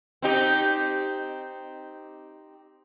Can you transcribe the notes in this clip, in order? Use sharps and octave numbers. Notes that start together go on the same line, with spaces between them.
C4 D#4 G4